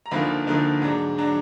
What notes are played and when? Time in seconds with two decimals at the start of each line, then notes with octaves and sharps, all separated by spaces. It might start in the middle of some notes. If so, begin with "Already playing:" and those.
0.06 A#5
0.11 D2 D3 F3 A#3 D#4 B5
0.47 D2 D3 F3 A#3 D#4
0.82 G#2 F#3 D4
1.18 F#3 D4